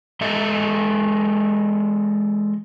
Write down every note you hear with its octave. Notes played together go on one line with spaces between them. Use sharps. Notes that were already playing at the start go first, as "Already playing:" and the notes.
E3 G#3 A4 D#5 E5